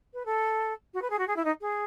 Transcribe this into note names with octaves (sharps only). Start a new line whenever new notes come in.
B4
A4
F#4
B4
G#4
F#4
G#4
E4
D#4
G#4